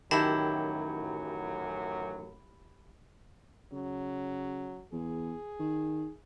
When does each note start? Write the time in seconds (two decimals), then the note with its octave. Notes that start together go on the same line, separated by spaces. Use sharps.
0.11 A1 F#2 D#3 F#3 E4 G4 A5 B5
3.72 C#3 F#3
4.93 E2 G#4
5.60 D#3